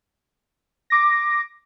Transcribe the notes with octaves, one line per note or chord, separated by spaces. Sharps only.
D6 A#6